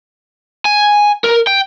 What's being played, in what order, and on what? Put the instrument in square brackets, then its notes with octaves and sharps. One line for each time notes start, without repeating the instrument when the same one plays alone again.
[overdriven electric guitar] G#5
A#4
G5